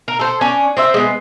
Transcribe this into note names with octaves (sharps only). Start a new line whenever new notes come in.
A#4
A4 C5
C#4 D4
C4 C5 E5
G#3 B3